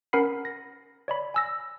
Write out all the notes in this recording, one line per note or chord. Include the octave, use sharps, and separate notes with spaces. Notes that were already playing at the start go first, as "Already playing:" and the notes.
C#4 A#4 F#5 B5 C7
A#6
C#5 D5 B5
G#5 E6 A#6